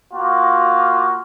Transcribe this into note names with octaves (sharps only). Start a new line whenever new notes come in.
A#3 F4 F#4